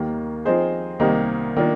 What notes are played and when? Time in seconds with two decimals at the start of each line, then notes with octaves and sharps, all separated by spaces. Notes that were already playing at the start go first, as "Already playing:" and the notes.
Already playing: D#2 D#3 A#3
0.45 F3 C4 D#4 G#4 C5
1.00 C2 C3 D#3 A#3 D#4
1.56 D#3 A#3 D4 F4